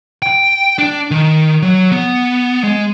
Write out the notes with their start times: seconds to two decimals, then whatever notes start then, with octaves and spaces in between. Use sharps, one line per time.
0.22 G5
0.78 D4
1.11 D#3
1.62 F#3
1.92 B3
2.64 G#3